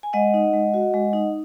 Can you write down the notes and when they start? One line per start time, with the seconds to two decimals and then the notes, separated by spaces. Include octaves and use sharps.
0.03 G#5
0.13 G#3 D#5 F#5
0.34 D#4
0.53 G#3
0.74 F#4
0.94 G#3
1.13 D#4